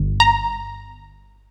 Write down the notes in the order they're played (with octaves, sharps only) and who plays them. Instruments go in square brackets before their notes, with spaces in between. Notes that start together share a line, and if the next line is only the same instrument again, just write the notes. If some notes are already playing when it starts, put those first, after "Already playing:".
Already playing: [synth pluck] G1
A#5